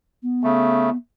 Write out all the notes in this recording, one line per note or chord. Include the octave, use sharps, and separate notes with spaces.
B3
C#3 A3